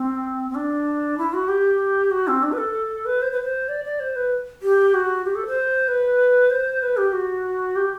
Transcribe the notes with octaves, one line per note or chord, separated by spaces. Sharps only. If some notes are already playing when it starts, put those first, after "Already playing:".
Already playing: C4
C4
D4
E4
F#4
G4
F#4
C4
D4
B4
A4
B4
C5
B4
C5
D5
D5
C5
B4
G4
F#4
G4
A4
C5
B4
C5
B4
G4
F#4
G4